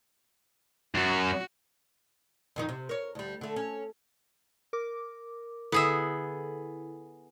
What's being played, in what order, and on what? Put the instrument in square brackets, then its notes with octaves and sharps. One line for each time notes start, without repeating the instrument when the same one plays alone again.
[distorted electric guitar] F#2 [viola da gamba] F#4
[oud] F2 D#3 D#4
C3
A#4 C#5
D2 G3
D3 A3
C#4
[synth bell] A#4 D6
[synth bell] D3 E4 A4 [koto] B3 G#4 E5